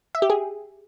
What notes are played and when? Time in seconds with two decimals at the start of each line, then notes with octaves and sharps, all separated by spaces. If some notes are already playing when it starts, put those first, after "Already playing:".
0.15 E5
0.22 G4
0.30 G#4